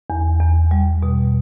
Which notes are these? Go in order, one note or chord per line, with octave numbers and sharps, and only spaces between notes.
E2
E2
G3
B2